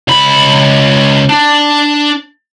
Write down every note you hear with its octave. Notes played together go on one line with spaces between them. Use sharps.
C#2 B5
D4